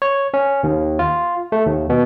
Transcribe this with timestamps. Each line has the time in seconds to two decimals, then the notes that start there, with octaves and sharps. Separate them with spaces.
0.02 C#5
0.34 C#4
0.63 D#2
0.99 F4
1.52 A3
1.66 D#2
1.90 B2